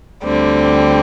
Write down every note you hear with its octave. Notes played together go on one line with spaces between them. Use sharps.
D2 D3 G3 C4